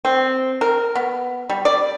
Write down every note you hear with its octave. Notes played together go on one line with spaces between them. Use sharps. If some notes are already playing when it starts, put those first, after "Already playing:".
C4
A#4
B3
G3
D5